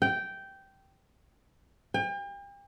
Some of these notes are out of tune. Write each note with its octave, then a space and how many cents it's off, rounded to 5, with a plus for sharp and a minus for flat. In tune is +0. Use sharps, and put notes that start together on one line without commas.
G5 -10
G5 +40